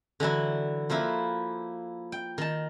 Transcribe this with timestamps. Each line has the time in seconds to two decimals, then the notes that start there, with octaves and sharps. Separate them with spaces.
0.20 D3 E3 F#3 E4
0.90 F3 A#3 E4 B4
2.12 G5
2.38 D#3 A5